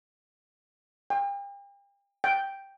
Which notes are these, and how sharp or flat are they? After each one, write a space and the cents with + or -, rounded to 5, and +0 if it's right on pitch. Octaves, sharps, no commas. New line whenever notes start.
G5 +40
G5 +0